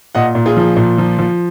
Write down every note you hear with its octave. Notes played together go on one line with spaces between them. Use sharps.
A#2 D#5 F#5
A#2
F4 G#4
F3
A#2
F3
F3